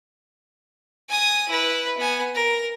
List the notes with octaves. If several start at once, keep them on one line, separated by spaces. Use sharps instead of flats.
G#5 D#6
E4 B4
B3 G#5
A#4